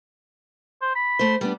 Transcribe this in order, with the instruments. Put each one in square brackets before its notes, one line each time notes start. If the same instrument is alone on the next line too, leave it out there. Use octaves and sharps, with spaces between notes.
[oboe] C5
B5
[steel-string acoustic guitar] A3 C5
G3 B3 D4